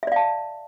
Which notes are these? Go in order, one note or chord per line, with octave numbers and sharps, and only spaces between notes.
D5 E5 F5 A5